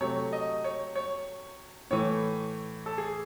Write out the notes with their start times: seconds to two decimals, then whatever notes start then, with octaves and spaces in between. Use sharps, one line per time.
0.01 C3 F#3 A3 C#5
0.33 D#5
0.64 C#5
0.96 C#5
1.91 A2 E3 A3 C#5
2.86 A4
2.98 G#4